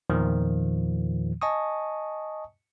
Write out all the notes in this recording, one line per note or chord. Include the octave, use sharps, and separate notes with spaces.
E2 A#2 D#3 F3
D#5 G#5 A5 C#6 D#6